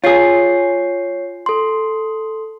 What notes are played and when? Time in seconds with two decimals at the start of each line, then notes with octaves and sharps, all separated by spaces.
0.04 F4 G#4 C#5 C7
1.46 A4 C6